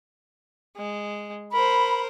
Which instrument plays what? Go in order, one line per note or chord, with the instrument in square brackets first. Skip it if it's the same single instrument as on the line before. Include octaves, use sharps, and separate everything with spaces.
[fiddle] G#3
[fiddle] A#4 C5 [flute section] B5